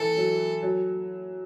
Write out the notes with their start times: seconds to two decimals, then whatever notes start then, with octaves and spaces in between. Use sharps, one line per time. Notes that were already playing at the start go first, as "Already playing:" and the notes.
Already playing: E3 A4
0.17 F#3
0.63 F#3